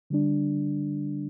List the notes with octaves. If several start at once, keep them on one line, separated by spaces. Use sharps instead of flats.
D3 G3 D4